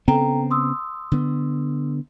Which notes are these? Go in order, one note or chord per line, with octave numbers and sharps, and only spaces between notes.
C#3 B3 C4 A4 G5 A#5
C6 D#6 E6
D3 B3